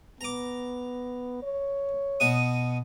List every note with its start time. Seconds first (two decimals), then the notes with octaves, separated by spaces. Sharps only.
0.21 B3 A#5 D6
1.43 C#5
2.20 B2 F#4 D#6